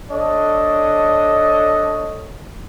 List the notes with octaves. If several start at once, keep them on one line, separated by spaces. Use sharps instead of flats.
D4 A4 C#5 D#5